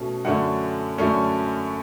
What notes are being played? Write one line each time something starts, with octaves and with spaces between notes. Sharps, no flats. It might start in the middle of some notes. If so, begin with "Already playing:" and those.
Already playing: B2 A3 C#4
F#2 D3 A3 C#4 F#5
F#2 D3 A3 C#4